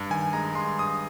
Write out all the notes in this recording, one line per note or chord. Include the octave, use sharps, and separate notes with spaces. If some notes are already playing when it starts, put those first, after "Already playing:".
Already playing: G2
D#3 G#5
G#3 A#5
G2 C6
G2 D#6